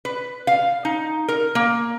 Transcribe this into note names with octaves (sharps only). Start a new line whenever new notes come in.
B4
F5
D#4
A#4
A#3